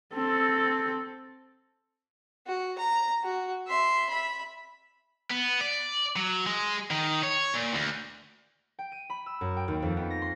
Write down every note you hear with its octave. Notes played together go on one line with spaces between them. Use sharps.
C4 A4
F#4
A#5
F#4
E5 C6
E5 B5
B3
D5
F#3
G#3
D#3
C#5
A#2
D2
G5
D#7
B5
E6
F#2
G5
D#2
F2
B3
A#6
C6